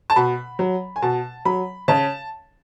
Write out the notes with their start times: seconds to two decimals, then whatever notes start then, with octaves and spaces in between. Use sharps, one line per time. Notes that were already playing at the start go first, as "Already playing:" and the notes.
0.10 A5
0.16 B2 B5
0.59 F#3
0.96 G#5
1.02 B2 A5
1.45 F#3 B5
1.88 C#3 A5